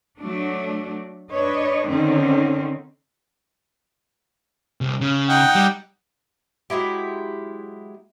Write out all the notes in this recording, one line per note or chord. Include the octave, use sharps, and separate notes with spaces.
F#3 A3 D4
D4 B4 C#5 D#5
D3 D#3 C4 C#4
C2
C#3
D#4 F#5 G5
G3
F#3 G#3 E4 G4